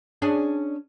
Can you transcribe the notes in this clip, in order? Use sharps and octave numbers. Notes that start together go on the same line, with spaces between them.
C#4 D4 G#4